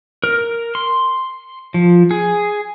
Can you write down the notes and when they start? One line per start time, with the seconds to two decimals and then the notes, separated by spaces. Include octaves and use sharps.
0.24 A#4
0.75 C6
1.74 F3
2.11 G#4